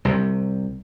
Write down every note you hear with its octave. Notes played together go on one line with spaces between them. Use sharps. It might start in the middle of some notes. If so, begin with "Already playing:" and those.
C2 C3